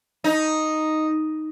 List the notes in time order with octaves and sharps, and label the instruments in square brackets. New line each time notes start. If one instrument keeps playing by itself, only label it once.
[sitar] D#4